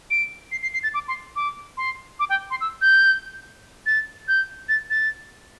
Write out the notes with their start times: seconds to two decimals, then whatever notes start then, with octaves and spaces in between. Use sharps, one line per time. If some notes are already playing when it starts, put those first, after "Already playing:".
0.11 D7
0.52 C7
0.62 C7
0.74 C7
0.83 A6
0.94 D6
1.08 C6
1.36 D6
1.77 C6
2.19 D6
2.29 G5
2.51 C6
2.61 E6
2.81 G6
3.86 A6
4.28 G6
4.69 A6
4.90 A6